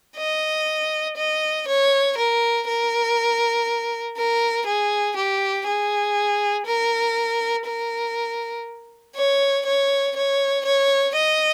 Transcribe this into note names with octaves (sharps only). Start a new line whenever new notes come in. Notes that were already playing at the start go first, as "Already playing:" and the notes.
D#5
D#5
C#5
A#4
A#4
A#4
G#4
G4
G#4
A#4
A#4
C#5
C#5
C#5
C#5
D#5